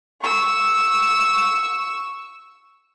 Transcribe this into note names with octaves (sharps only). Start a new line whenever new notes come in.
C#6 E6